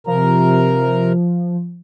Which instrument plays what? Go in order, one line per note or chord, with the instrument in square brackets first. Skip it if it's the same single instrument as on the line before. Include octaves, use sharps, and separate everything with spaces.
[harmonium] C3 A#4 A#5 [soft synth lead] F3